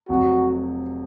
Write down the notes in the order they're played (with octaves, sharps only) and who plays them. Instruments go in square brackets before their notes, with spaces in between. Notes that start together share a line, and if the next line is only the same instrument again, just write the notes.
[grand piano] F1 F2 C3 F#3 [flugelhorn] F#4